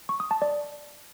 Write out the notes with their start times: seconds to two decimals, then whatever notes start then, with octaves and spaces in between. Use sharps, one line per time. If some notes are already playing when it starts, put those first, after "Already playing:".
0.09 C#6
0.20 D#6
0.31 A5
0.42 D5